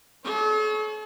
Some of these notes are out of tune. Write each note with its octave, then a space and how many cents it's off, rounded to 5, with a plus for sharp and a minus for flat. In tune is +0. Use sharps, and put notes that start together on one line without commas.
A4 -45 C#5 +0